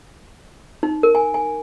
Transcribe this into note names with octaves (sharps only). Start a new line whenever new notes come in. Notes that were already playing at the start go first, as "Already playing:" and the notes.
D#4
A#4
G#5
G#5